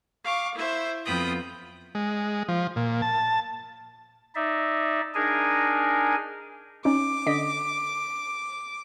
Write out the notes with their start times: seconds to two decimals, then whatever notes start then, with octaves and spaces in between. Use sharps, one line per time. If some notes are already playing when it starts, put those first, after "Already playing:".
0.23 F5 C#6 D6
0.54 E4 C5 E5
1.05 F2 B3 F4 G5 B5 D#6
1.95 G#3
2.48 F3
2.76 A#2
3.02 A5
4.35 D#4 D5 E5
5.15 D4 D#4 G#4 A#4 G#5
6.85 C#4 D#4 D6
7.26 D3 D#5 B6